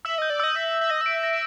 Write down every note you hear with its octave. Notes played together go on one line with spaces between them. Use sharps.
E5 E6
D#5 G6
D5
D#5 E6
E5 A#6
A#6
E5
D#5 A#6
E5
D7
A#6